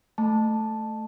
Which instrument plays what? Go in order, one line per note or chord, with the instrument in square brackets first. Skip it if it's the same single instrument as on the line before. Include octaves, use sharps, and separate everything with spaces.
[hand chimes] A3 A5